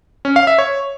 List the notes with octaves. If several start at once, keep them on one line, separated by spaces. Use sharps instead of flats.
C#4
F5
E5
C#5